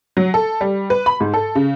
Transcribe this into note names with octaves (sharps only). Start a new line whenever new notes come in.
F#3
A4
G3
B4
B5
G#2
A4
C#3